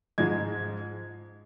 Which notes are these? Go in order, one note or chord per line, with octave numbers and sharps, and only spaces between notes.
G#2 F3 G#3 G#6